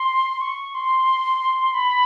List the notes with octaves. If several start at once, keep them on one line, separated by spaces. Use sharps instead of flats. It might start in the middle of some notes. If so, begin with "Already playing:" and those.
Already playing: C6
C6
C#6
C6
B5